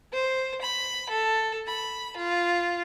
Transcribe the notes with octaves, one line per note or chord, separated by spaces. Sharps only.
C5
B5
A4
B5
F4